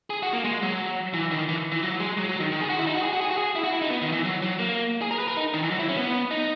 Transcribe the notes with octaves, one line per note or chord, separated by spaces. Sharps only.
G#4
F#4
A#3
G#3
F#3
E3
D#3
E3
E3
F#3
G#3
F#3
F#3
D#3
D#3
G#4
F#4
E4
D#4
F#4
G#4
F#4
G#4
F#4
G#4
E4
F#4
E4
D#4
B3
D#3
E3
F#3
F#3
A#3
G#4
A#4
B4
A#4
D#4
D#3
E3
F#3
E4
C#4
B3
D#4